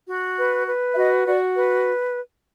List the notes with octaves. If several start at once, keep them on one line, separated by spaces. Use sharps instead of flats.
F#4
B4
B4
E5
F#4 D#5
F#4 D5
B4